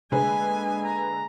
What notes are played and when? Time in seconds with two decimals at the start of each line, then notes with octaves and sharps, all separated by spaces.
0.12 D3 G#3 A#3 G#4 B4 G#5
0.84 A#5